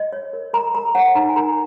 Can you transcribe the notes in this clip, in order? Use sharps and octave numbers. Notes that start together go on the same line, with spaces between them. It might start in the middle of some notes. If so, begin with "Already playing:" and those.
Already playing: D#5
C#5
A#4
A#4 A#5
A#4 A#5
C#5 F#5
D#4 A#5
G#5
A#4 A#5